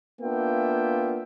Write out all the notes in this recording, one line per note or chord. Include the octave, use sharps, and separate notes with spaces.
A#3 B3 D4 F4 E5 G5